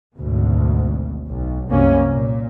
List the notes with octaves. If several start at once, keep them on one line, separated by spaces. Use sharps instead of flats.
G#1 D2 B2
B1
C2 F#2 C3 A#3 C#4
A#2 A#3